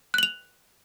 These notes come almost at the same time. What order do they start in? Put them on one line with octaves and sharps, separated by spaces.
F#6 F#7 F7